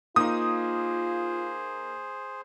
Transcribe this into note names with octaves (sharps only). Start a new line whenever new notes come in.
A#3 D#4 F4 G#4 C5 D#6